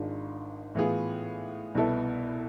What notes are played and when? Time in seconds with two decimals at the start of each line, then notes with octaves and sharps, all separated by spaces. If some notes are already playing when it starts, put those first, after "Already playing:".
Already playing: G#1 G#2 G#3 D4 F4
0.75 A2 E3 B3 F4 G#4
1.75 C2 B2 B3 E4 A4